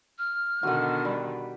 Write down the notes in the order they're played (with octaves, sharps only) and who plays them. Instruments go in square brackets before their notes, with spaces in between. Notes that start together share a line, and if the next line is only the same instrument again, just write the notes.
[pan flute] F6
[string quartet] B2 D3 D#3 [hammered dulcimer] F#4 F#5
[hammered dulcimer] G3